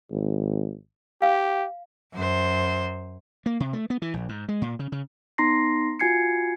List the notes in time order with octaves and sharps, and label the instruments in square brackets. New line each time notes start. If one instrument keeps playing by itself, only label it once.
[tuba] G#1
[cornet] G4 [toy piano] F5
[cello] F#2 C5
[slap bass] A#3
C3
A3
B3
E3
A#1
G#2
G#3
A#2
C#3
C#3
[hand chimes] B3 D#4 A#5 C6 A#6 C7
F4 F#4 G#5 G#6 C7 C#7